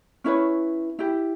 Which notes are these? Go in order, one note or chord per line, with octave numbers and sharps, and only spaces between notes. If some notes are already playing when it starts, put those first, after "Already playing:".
C#4 E4 B4 C#5
E4 G4